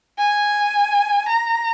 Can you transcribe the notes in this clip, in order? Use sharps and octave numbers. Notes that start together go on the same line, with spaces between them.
G#5
A#5